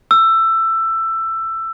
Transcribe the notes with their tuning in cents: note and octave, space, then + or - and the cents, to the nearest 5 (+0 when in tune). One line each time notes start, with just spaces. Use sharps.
E6 +15